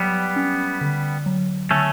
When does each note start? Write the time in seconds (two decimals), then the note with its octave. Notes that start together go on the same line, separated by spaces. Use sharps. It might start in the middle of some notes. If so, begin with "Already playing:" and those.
Already playing: F#3 G3 B3
0.36 C#4
0.81 D3
1.26 F#3
1.70 D3 A3 C#4